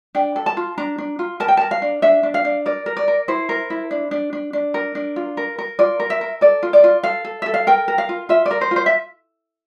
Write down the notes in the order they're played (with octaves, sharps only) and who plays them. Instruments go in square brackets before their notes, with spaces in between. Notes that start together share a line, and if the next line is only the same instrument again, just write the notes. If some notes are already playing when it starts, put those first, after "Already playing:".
[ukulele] D4 G5
A4
A5
F4
D4 A#5
D4
F4
A#4 A5
G5
A#4 A5
F5
D4
D4 E5
D4
F5
D4
A#4 D5
A#4
D5
A#4
E4 C5
A#4
E4
D4
D4
D4
D4
A#4
D4
F4
A#4
A#4
F4 D5
A#4
E5
A#4
A4 D5
F4
D5
F4
A4 F5
A4
A4 E5
F5
A#4 G5
A#4
F5
F4
F4 E5
D5
A#4
C5
F4
C5
E5